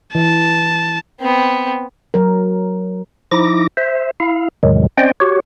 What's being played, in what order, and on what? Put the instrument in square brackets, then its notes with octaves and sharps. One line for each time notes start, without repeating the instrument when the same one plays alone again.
[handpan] E3 [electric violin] A5
[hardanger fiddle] B3 C4
[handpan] F#3 A#4
[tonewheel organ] F3 D#4 E4 D6 A#6
C5 E5
E4 F5
E2 A2 C3 D#3 F#3 G#3
C4 C#4 C5 D5 D#5 G5
F#4 G4 C#5